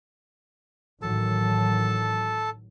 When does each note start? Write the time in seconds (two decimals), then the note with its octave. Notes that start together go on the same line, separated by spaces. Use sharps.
1.02 A1 D#3 F#3 A4 A5